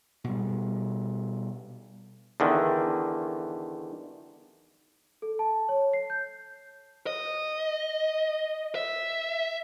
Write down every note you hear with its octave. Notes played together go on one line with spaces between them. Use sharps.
B2 G3
E2 D3 D#3
A4
A5
C#5
C7
G6
D#5
E5